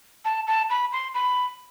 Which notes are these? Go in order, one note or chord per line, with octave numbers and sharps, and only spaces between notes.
A5
A5
B5
C6
B5